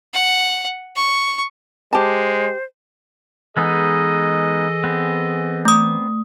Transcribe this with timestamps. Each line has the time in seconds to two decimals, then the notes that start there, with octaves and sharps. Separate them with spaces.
0.14 F#5
0.96 C#6
1.93 G#3 G4 C5 A5
3.57 E3 G#3 B3 D#4 G#4 A4 D#5
4.84 B3 C4
5.65 A3 D#6